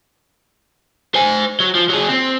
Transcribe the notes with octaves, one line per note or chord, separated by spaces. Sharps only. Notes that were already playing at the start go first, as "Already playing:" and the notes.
C5 G#5
F#3
F3
F#3 G#4
C4